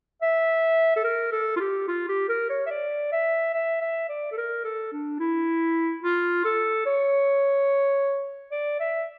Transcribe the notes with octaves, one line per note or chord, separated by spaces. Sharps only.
E5
A4
A#4
A4
F4
G4
F4
G4
A#4
C#5
E5
D5
E5
E5
E5
D5
A4
A#4
A4
D4
E4
F4
A4
C#5
D5
E5